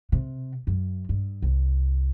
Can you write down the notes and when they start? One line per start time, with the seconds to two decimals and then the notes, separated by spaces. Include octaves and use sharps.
0.12 C3
0.67 F#2
1.09 G2
1.42 C2